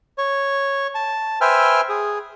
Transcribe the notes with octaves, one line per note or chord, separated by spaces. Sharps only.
C#5
A5
B4 C5 E5 G5 G#5 F6
G#4